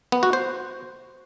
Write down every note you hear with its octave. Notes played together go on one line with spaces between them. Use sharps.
B3
F#4
C5